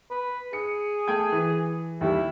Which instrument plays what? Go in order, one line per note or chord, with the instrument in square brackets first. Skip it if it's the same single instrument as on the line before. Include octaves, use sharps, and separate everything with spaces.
[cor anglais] B4
[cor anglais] G#4 [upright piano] C#7
[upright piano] A3 G5 G#6
E3
[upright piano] D#2 G3 [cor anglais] E4